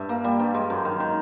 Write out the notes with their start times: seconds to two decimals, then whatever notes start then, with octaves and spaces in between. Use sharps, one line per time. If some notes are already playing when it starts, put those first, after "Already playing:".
Already playing: G2 E5
0.09 A#3
0.24 G3
0.39 G2
0.54 G#3
0.70 F#2
0.85 D#3
1.00 D#3